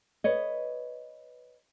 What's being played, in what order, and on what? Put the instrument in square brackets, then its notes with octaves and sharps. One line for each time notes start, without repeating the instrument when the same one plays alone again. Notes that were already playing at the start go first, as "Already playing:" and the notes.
[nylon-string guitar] B4 C#5 D#5